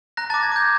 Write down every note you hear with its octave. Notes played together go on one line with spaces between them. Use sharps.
A#5 F#6 A#6
A5 D6 A6
G#6
D6 G6